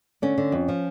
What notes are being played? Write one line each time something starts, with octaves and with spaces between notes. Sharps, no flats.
D3 C#4
D3
F2
F3